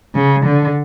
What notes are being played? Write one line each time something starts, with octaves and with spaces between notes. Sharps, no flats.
C#3
D3